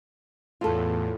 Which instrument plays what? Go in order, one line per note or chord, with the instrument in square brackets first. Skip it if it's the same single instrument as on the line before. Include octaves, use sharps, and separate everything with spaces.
[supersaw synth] E2 A2 [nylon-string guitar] F4 A4